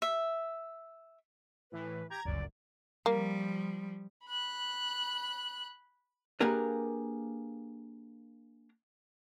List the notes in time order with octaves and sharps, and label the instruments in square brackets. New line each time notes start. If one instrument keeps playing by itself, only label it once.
[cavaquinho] E5
[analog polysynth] A2 E3 [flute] B4
[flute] G4 [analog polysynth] A#5 G#6
[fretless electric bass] D1 G1 C#2 [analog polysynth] F#2 [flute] D5
[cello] F3 G3 [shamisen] A#3
[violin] B5 F#6
[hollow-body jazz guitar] A#3 D4 G4 G#4 A#4 B4